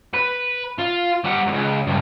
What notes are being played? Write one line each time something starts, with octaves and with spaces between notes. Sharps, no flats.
B4
F4
G3 F#5
C#2 G2
C#2 G2